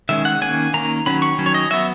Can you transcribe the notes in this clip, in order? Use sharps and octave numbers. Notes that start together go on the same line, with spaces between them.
D#3 G#3 C#4 E5
F#5
D#3 A#3 C#4 G#5
D#3 A#3 C#4 A#5
D#3 F#3 C#4 B5
C#6
D#3 F#3 C#4
C#5
D#5
F#3 B3 E5